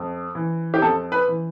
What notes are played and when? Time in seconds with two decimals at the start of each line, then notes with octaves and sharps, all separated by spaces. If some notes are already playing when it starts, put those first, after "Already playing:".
Already playing: F2
0.35 E3
0.74 G4
0.82 F2 A4
1.12 B4
1.28 E3